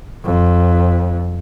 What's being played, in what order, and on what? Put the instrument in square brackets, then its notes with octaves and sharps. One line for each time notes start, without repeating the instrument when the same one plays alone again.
[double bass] F2